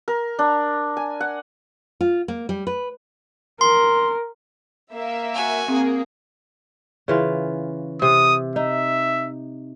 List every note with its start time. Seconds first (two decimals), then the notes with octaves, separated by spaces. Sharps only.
0.08 A#4
0.39 D4
0.97 G#5
1.20 F#5
2.01 F4
2.28 A#3
2.49 G3
2.67 B4
3.61 A#4 C6
4.94 A#3 E5
5.34 F#4 G#5
5.68 A#3 C4 G#4
7.08 C#3 E3 F4
8.02 C3 D#6
8.56 D#4 E5